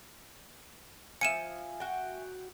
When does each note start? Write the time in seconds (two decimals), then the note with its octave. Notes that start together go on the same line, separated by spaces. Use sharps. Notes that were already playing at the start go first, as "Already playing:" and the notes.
1.21 F3 E5 G#5 C#7 D#7 E7
1.80 F#4 G5